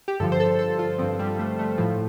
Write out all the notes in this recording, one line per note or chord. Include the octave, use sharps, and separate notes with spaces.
G4
G2 D3 F3 A4
C5
A4
A4
F4
G2 D3 F3 C4
G3
A3
A3
A2 F3